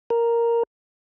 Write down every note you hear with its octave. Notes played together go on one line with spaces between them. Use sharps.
A#4